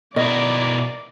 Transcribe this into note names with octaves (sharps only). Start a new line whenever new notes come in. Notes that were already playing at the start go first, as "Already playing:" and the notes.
B2 E4 A#4 D5 D#5